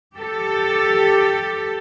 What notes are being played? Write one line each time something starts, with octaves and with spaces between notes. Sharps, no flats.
G4 A4